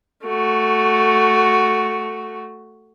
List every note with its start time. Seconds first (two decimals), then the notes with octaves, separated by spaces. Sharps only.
0.24 A3 F#4